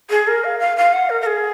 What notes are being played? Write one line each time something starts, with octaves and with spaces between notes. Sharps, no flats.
G#4
A#4
F5
F5
F5
F#5
A#4
A#4
G#4